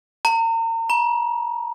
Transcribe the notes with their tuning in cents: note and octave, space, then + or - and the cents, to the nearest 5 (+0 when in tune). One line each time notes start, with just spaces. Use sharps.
A#5 -40
A#5 +45